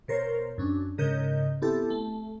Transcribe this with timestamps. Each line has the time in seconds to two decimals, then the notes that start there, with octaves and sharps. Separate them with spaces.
0.08 B2 A#4 C5 C#5
0.58 F#2 C#4 D4
0.98 G#2 C#3 A#4 D#5 G6
1.62 B3 C4 E4 G4 A4
1.90 A3